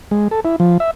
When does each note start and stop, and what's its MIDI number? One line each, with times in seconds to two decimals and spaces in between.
0.11 0.28 56
0.31 0.40 69
0.45 0.56 64
0.60 0.78 53
0.80 0.91 76